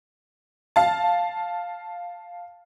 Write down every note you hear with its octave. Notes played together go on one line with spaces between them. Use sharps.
F5 A5